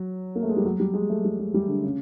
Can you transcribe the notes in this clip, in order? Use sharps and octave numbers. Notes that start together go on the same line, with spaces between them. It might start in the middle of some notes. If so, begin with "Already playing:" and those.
Already playing: F#3
A#3
A3
G#3
G3
F#3
G3
G#3
A3
G3
G#3
G3
D3
C#3